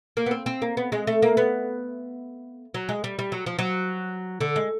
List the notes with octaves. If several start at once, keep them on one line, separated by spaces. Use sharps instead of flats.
A#3
B3
C4
C4
A#3
B3
G#3
A3
A#3
B3
F#3
G#3
G3
G3
F#3
F3
F#3
D3
G#3